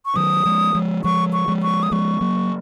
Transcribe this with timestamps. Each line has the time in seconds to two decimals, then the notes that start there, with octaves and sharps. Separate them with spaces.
0.05 C#6
0.16 D#3 F#3 D#6
0.45 F3 G#3
0.74 F3 G#3
1.04 F3 G#3 C#6
1.33 C#6
1.48 F3 G#3
1.62 C#6
1.83 D#6
1.91 F3 G#3 C#6
2.21 F#3 A#3